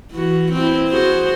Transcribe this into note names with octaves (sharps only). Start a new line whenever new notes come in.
E3 F#4
C4 E4
F#4 G#4 C5